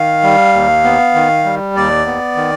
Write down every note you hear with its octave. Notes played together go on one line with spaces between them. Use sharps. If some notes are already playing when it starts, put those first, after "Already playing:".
Already playing: D#3 F5
G3
D#2
B3
D#3
G3
D#2 D5
B3
D#3